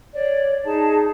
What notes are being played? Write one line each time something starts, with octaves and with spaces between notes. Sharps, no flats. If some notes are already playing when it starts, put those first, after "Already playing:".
C#5 D5
D#4 G#4 A5